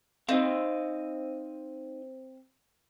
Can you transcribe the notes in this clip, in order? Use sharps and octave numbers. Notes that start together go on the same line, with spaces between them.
C4 D#4 D#5 F5